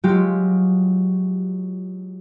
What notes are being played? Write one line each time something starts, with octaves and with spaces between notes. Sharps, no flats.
F#3 G#3 F4 G4